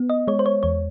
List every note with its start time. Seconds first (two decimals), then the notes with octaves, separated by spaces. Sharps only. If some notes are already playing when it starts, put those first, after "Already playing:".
Already playing: B3
0.10 D#5
0.28 G#3 C#5
0.39 C5
0.46 C#5
0.63 E2 C#5